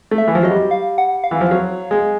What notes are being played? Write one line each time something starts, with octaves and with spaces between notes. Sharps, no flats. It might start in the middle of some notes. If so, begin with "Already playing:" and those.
A3
E5
E3
F3
F#3 D#5
G3
F5
F#5
F5
E3
F3
F#3
G#3